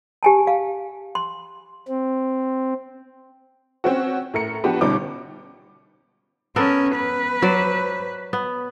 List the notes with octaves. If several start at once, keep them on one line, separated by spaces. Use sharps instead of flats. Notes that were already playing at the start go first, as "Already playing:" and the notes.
G4 G#5 A5
F5
C6
C4
C4 C#4 F#4
A2 A#4 C#7
F3 B3 D4 F#4 G4 B4
G1 B2 G3 C#4 D#4 D6
B3 C#4 A4 A#4
B4
F#3 C5 D5
B3